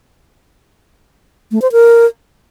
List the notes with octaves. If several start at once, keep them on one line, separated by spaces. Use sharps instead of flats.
A3
C5
A#4